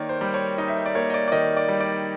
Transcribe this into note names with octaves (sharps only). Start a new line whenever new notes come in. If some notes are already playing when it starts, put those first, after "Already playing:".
Already playing: D#3 A#3 D#4 C#5 D5
C5
G3
C#5
D#4 D#5
E5
D#5
D5
A#3 C#5
D#5
D5
D5
D#3 D#5
D5
G3
D5